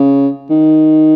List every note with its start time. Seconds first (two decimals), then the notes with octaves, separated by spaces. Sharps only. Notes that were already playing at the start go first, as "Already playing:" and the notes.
Already playing: C#3
0.50 D#3